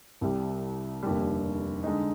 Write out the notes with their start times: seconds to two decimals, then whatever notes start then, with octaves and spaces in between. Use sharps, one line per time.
0.21 C2 C3 G3
1.03 F1 D#2 D3 G3
1.84 D3 G#3 D#4